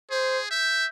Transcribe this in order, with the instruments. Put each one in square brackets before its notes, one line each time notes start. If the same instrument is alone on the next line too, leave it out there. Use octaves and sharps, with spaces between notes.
[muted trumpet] G#4 [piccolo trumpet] C5
[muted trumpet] E5 [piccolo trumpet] G6